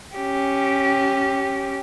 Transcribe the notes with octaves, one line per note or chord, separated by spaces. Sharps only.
C#4 G4